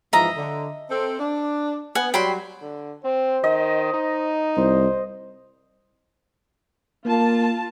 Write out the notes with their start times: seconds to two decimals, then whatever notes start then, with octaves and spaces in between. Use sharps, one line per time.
0.13 G#2 E3 F3 D#5 E5 A#5
0.36 D3
0.90 C4 A4
1.20 D4
1.95 B3 F#5 G#5
2.14 F#3 G3 G5 B5 C6
2.62 D3
3.05 C4 C5
3.44 D#3 D#5
3.94 D#4
4.57 C2 C5
7.05 A#3 F4 A5